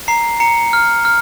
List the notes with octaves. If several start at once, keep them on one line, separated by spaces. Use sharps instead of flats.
A#5 C7
A#5 C#7
F6
F6